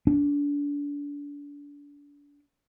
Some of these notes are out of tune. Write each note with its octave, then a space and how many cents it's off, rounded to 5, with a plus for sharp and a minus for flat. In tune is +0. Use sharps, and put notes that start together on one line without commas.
D4 -30